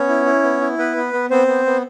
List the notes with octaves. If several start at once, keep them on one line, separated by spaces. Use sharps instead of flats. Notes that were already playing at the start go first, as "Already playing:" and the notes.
Already playing: B3 C#4 C#5
E4
E4
B3
E4
B3 B4
B3
B3
B3 C4 C5
B3
B3